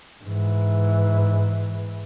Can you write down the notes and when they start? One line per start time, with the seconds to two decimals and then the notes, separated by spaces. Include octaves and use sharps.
0.24 G#2 E3